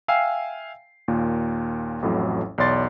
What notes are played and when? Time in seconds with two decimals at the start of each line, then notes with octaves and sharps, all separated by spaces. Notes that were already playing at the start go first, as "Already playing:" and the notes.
0.08 E5 F5 G5 G#5 E6 C7
1.08 D#2 A#2
2.02 A1 F2 A2 F#3
2.58 B1 E2 C#5 D5 C6 A6